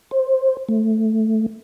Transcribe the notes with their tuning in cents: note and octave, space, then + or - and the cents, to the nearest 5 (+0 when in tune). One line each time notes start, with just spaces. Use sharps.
C5 +15
A3 +0